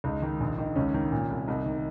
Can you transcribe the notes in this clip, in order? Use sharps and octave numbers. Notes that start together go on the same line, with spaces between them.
C#2 D#4
D#3
A#1
D#3
C#2 C#4
D#3
A#2
C2
C2 D#4
D#3